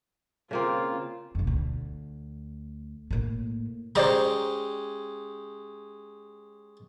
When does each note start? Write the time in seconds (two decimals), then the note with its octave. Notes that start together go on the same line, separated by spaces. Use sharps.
0.51 C#3 A#3 C4 F4
1.35 F2 B2
1.47 D2
3.11 A2 A#3
3.95 G#3 C#4 G4 C5 D5 A#5